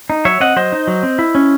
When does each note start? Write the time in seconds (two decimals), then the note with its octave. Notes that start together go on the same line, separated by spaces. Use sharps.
0.10 D#4
0.25 F#3 C#5 E5
0.40 C4 D#5 F#5
0.56 F#3 C5 D#5
0.72 D#4
0.87 F#3
1.03 C4
1.19 E4
1.35 C#4